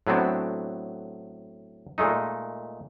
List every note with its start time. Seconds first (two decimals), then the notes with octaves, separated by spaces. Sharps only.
0.07 A2 F#3 B3 C4 D4
1.98 A#2 G#3 A3 D#4